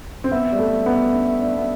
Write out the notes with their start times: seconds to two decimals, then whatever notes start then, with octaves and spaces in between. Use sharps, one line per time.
0.24 C4
0.31 B3 E5
0.52 G3
0.59 A3
0.86 B3
1.14 D4
1.41 D4
1.57 B3